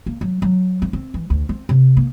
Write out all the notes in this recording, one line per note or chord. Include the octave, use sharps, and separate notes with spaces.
A#3
F#3
F#3
C4
C4
E3
D2
C4
C3
A#3